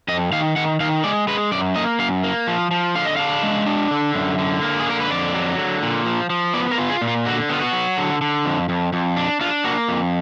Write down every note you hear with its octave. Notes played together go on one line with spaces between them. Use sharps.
F2 D#5
D#3 F5
D#3 F#5
D#3 F5
G#3 D5
G#3 B4
F#2 D5
A#3 D#5
F#2 F5
A#3
F3
F3
D3 F5
D#5
D4 F5
G#3
D4
D3
F#2
D3
A#3
G#4
D3 A#4
B4
F2 D5
F#3
D3
A#2
F3
F3
B3 D5
A#4
F4
G#4
A#2
F4
D3 F#4
B3 F4
F#4
F#3
D3
D3
F2
F2
F2
D4
D4 F4
A#3 F#4
F2